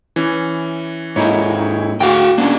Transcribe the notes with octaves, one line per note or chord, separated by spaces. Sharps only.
E3 C#4
G#2 A#3 D#4 E4 C#5
D2 F#4 F5 G5
A#3 C#4 D4 G4